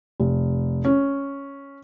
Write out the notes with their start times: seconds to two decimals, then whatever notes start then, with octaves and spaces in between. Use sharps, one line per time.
0.20 F1
0.85 C#4